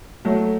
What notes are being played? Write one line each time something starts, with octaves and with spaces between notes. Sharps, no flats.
F#3 A3